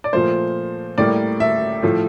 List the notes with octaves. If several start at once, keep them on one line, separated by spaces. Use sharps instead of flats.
D5
A#2 F3 A3 C5
A2 G3 A#3 D5
E5
A2 F3 A3